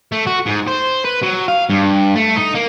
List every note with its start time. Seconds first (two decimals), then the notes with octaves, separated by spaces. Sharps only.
0.12 A3
0.27 F#4
0.46 G#2
0.67 C5
1.04 B4
1.23 F#3
1.48 F5
1.69 G2
2.15 A3
2.36 D#4
2.54 A#3